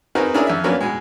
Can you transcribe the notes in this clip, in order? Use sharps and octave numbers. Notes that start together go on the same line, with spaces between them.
C4 D#4 F#4 G#4 A#4 B4
C#4 D4 E4 G#4 A#4
F2 E5
F#3 A#3 B3 C#4 D4
B2 G#3